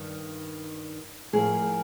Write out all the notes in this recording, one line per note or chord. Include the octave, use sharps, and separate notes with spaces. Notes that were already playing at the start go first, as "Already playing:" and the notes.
Already playing: G2 D#3
A2 F3 G#4 A#4